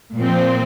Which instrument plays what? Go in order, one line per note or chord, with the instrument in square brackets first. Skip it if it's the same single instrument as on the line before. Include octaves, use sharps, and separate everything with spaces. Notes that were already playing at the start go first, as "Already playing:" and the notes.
[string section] A#2 F3 C4